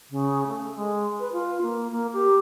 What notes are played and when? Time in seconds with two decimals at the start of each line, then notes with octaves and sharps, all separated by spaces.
0.10 C#3
0.47 A3
0.75 G#3
1.20 B4
1.33 F4
1.62 A#3
1.92 A#3
2.14 G4